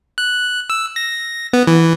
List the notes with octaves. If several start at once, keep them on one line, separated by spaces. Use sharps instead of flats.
F#6
E6
A#6
B3
E3